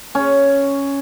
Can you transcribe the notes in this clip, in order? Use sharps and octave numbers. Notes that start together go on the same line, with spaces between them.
C#4